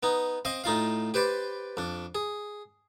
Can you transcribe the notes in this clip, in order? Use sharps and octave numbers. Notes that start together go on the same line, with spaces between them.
B3 D#4
C4 D#5 F5
A2 D#4 F4 F5
G4 B4 C5 D5
F2 D4
G#4